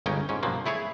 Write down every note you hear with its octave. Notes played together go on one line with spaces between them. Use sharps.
G1 C#2 C#4 D#4 G5
G#2 C#4
B1 G2 F3 F#3 A#3
A3 E4 G#4 C#5